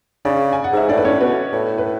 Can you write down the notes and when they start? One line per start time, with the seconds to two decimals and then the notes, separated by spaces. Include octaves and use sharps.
0.25 C#3 D4 D5
0.53 G#5
0.64 F#5
0.73 G#2 E5
0.89 A2 D4 D5
0.98 B4
1.05 C#4 C#5
1.20 B2 B3 B4
1.52 A2
1.78 B4